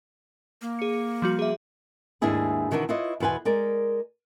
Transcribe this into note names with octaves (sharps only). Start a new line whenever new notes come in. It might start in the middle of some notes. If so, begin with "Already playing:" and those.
A#3
G#4 C#7
F3 G3 F#4
G#4 E5
D#2 G#2 D4 E4 G#4 B4
B2 D#3 E3 D4 F#4
E4 F4 B4 C#5 D#5
E2 B2 B4 C5 G#5
G#3 A#4 D5